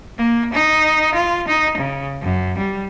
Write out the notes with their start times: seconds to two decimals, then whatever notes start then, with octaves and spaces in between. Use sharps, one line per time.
0.18 A#3
0.53 D#4
1.14 F4
1.48 D#4
1.77 C#3
2.21 F#2
2.58 G3